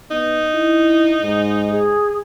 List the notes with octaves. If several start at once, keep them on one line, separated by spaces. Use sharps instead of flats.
B3 D#4
E4
G#2
G#4